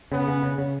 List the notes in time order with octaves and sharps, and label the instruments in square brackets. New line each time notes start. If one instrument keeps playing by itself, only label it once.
[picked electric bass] C#3 [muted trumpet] B3
[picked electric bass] C#3
C#3
C#3